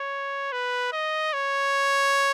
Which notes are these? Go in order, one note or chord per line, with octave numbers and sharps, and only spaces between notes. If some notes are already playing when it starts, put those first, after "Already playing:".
Already playing: C#5
B4
D#5
C#5